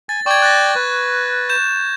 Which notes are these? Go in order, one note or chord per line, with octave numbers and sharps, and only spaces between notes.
G#5 A6
D5 G5 C#6 G#6
F#6 A6 A#6
B4
G6 E7